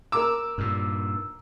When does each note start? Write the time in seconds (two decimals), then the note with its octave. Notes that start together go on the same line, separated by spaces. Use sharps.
0.12 A#4 D6 E6
0.58 G2 A#2